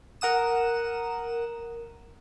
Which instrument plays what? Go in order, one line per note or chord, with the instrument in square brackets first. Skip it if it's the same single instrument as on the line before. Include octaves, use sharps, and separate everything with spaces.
[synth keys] A#4 F#5 D#6 E7